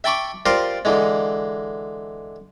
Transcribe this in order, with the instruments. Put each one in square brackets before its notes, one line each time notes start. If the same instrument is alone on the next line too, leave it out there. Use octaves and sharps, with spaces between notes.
[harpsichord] E5 G5 A5 B5 C#6 D6
F4 G4 A#4 C5 D5
D3 E3 G#3